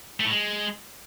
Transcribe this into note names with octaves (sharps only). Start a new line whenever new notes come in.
A3
A2
G#3